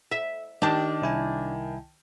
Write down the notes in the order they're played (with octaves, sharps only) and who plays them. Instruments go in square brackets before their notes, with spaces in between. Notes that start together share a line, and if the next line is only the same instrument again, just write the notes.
[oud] E5
[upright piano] D#3 A5 [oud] D4 G4
[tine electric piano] C2 E4 G#5